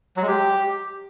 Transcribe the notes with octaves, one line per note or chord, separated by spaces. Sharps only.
F#3
G#3
G4